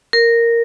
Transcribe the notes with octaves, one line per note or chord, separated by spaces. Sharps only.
A#4